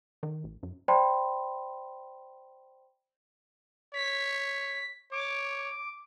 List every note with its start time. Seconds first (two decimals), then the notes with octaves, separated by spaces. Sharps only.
0.23 D#3
0.44 A1
0.63 F#2
0.88 C5 D5 G5 A5 B5 C6
3.94 C#5 B6
5.12 C#5 D6